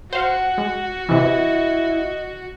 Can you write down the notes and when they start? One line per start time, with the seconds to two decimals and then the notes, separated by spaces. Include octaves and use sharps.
0.13 F#4 C5 F5 F#5
0.58 G#3
1.09 C3 E3 E4 D#5